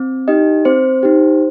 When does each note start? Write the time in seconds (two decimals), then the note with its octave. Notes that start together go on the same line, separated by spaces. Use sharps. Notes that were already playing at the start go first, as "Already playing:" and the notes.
Already playing: C4
0.28 D#4 G4 D#5
0.65 C4 C5
1.03 D#4 G4